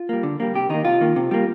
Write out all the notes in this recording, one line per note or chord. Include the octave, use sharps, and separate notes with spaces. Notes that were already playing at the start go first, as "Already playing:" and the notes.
Already playing: F4
G3 A#3
D3
G3 A#3
C3 G4
D#3 A#3 D#4
C3 F4
D#3 A#3
C3
G3 A#3